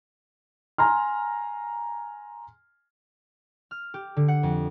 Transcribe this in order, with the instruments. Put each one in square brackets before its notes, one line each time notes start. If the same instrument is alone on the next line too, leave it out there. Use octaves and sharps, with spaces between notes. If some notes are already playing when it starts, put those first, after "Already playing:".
[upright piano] G#5 A#5 C6 F6
[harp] F6
G4
D3
F#5
F2